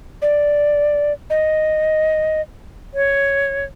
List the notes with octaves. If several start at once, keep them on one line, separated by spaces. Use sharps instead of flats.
D5
D#5
C#5